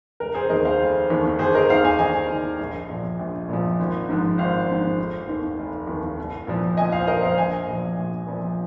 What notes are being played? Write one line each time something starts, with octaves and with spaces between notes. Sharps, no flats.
F1 A#4
G#4 C5
D#2 D#3 A#4 D#5
C5 F5
F1
D#2 D#3
D#2 G#4 C5
A#4 D#5
D#3 C5 F5
D#5 G#5
D#2 D#5 G#5
D#3
A#1
A#2 F3
A#1
A#2 F3
G#1
G#2 F3
G#1 C5 F5
G#2 F3
F1
D#2 D#3
F1
D#2 D#3
C2
A#2 F3
C2 D#5 G#5
C5 F5
A#2 F3 A#4 D#5
C5 F5
A#1 D#5 G#5
A#2 F3
A#1
A#2 F3